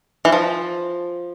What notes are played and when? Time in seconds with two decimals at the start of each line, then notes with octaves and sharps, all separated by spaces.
0.25 E3
0.32 F3